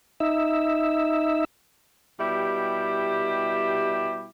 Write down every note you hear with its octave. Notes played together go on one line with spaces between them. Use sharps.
D#4 E5
B2 G3 E4 G4